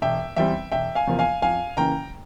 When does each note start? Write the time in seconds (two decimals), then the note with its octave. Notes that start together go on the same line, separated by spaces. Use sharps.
0.02 E1 E5 G5
0.36 E2 E3 G3 C4 E5 G5
0.72 E1 E5 G5
0.95 F5 G#5
1.07 E2 C3 F3 A#3
1.19 F5 G#5
1.42 F2 F5 G#5
1.77 C#3 E3 A#3 G5 A#5